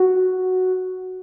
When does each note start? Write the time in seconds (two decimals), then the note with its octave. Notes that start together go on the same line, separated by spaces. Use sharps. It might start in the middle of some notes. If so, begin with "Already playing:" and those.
Already playing: F#4